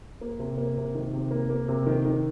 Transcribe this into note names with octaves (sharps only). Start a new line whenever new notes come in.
A#3
C3
A#3
C3
D#3
C3
A#3
A#3
C3
D#3
D#3